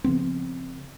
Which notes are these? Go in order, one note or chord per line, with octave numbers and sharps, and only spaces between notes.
C#3 F3 B3 C4